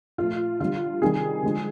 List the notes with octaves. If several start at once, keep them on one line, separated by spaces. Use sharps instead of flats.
A#2 F3 A3 F4
D3 G3 F4
C3 D#3 G3 G#4
D3 F3 G#3